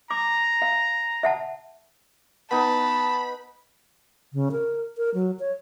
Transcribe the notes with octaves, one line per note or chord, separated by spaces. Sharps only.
A#5 D6
F5
E5 F#5 A5
B3 D#4 A5 B5
C#3
A#4
A#4
F#3
C#5